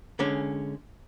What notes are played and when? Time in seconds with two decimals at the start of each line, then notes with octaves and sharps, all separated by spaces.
0.19 D3 G#3 C#4